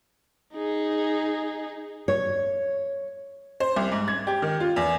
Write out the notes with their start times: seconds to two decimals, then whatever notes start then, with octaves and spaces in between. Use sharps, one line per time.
0.55 D#4 G#4
2.08 C#5
3.60 C5
3.76 C2
3.92 G#2
4.08 G#6
4.27 G4
4.42 D#3
4.60 F4
4.76 E2